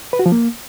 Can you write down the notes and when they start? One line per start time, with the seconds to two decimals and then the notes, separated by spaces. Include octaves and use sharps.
0.13 B4
0.19 F#4
0.26 F3
0.32 A#3